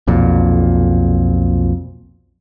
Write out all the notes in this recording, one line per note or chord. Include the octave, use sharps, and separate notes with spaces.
B1 F2 A#2